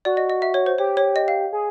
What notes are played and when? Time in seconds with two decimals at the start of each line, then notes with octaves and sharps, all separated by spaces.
0.05 F#4 D5
0.17 D#5
0.30 D#5
0.42 E5
0.54 C#5
0.66 C5
0.78 G4 C#5
0.97 C#5
1.16 D#5
1.28 F5
1.53 G#4